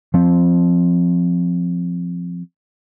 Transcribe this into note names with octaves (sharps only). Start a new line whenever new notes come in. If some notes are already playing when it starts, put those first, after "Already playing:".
F3 C4